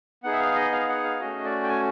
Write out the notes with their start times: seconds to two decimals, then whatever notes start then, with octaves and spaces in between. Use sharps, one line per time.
0.24 B3 D#4 G#4 F#5
0.32 E5
0.40 F5
0.56 D#5
0.72 F5
0.88 F#5
1.04 F5
1.20 A3 C#4 F#4 D#5
1.45 D5
1.63 G5
1.68 G#5